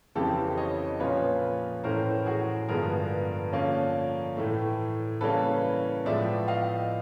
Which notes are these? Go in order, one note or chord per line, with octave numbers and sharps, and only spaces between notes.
F2 C#3 E3 A3 C4 G4 A4
C#5 D#5
A#2 F3 A#3 C#4 B4 C#5
A2 E3 A3 C#4 A#4 C5
F#4 G#4
G2 D3 F3 G#3 B3 G#4 A#4
D3 F3 A#3 C#4
A2 E3 A3
C#3 E3 G3 A#3 C#4 A4 B4
A2 F3 G#3 B3 D5 E5
D#5 F5